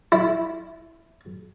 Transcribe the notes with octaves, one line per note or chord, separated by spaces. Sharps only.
E4